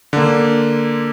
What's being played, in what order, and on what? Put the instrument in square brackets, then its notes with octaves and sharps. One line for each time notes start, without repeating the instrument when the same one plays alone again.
[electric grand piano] D3 A#3